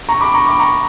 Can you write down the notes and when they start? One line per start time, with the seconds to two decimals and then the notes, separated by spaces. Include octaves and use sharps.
0.09 A#5 C#6
0.21 B5 D6
0.34 A#5 C#6
0.47 B5 D6
0.59 A#5 C#6